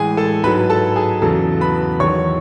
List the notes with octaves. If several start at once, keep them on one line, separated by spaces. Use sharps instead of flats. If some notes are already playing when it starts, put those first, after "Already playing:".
Already playing: A2 E3 G#3 G#4 G#5
A4 A5
G#2 F#3 B4 B5
A4 A5
G#4 G#5
E2 C#3 F#3 A4 A5
B4 B5
E2 D#3 F#3 C#5 C#6